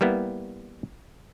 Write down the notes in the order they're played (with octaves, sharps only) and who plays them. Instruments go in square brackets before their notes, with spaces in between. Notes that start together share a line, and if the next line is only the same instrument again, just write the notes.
[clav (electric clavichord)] G3 A#3 B3 E4